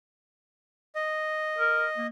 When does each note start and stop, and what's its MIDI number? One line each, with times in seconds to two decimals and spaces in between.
0.95 2.07 75
1.59 1.86 70
1.97 2.09 58